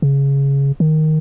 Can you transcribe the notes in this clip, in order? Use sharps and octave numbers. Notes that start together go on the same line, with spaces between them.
C#3
D#3